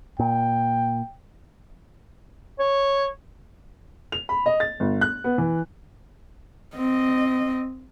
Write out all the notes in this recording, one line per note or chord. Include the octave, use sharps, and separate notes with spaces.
A#2 G5
C#5
F7
B5
D#5
A6
G1
F#6
B3
E3
C4 D#5